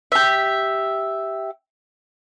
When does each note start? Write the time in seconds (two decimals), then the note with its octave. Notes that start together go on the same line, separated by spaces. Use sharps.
0.12 G4 E5